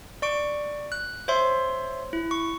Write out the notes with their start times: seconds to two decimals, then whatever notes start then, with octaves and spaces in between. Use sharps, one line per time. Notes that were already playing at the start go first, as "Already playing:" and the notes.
0.22 D5 C#6 D7
0.92 F#6
1.28 C5 C#5 E5 C6
2.13 E4
2.31 C#6